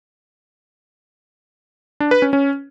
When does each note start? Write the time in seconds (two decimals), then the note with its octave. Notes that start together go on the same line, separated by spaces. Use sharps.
2.00 D4
2.11 B4
2.22 C#4
2.33 C#4